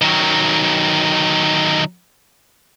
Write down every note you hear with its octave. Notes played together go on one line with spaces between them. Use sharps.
D#3 F#3